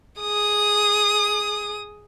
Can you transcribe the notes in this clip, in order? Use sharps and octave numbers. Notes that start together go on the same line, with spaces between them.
G#4 D#6